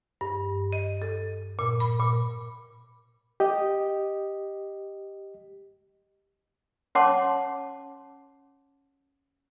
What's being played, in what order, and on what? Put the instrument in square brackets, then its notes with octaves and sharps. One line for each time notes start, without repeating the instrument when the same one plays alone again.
[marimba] G2
D#5
A4
A#2
B5
A#2
[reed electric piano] G4 D#5
[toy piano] C#4 C#5 F#5 A5 C6 D6